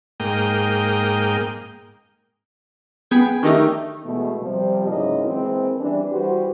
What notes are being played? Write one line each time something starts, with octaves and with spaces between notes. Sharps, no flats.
G#2 A#3 G5 D#6
B3 G#4 G5 G#5 B5
D#3 A3 D4 D#4 G4
B2 E3 G#3 A3 B3
C3 F3 G3
G#2 C#3 F#3 A#3 E4 D#5
E3 G#3 A#3 C4
E2 E3 G3 D4
E3 G3 F#4 G4 B4 C5